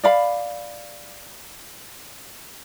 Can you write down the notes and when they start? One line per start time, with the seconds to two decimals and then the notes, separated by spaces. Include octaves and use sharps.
0.03 D5 F5 B5